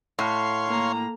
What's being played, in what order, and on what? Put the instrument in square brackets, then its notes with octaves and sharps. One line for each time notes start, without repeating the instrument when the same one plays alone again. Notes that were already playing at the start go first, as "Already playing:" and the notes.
[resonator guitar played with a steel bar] A2 [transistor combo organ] C#5 F5 C6
[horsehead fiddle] A#3 A#5